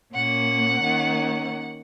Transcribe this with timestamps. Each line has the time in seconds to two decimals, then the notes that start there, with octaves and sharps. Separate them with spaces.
0.14 A#2 A#3 C#4 F#5
0.84 D#3 A#3 C#4